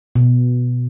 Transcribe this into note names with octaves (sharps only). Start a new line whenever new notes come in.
B2